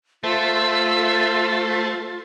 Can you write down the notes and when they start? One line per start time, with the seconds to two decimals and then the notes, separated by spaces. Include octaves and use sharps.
0.23 A3 F4 A4 C5 E5